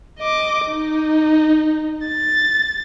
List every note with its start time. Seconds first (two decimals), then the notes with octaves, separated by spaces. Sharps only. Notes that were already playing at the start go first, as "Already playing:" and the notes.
0.19 D#5 D6
0.67 D#4
2.07 A6